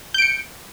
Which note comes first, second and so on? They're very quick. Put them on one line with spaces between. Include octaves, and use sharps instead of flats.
G6 D7 C#7